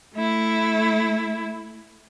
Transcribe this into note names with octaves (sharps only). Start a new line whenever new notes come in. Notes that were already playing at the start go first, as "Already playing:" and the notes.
A3 E4